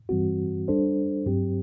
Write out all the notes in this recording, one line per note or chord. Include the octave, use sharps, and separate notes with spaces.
G2 E3 G3 C4 F#4
G3 D4 A4 C5
G2 F#3 C4 G4